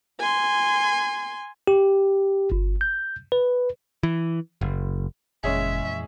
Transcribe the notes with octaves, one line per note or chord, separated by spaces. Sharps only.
G#5 C6
G4
G1
G6
B4
E3
F#1
F#1 F2 A#2 E3 G#3 C#4 G#4 E5